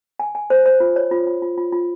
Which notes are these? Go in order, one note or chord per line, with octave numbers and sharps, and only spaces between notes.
G#5
G#5
C5
C5
F4
C#5
F4
F4
F4
F4
F4